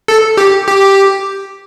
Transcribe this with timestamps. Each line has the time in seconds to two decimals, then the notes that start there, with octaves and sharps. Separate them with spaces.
0.08 A4
0.37 G4
0.68 G4